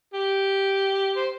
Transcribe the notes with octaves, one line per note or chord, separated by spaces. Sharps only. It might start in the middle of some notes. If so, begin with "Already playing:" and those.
G4
C5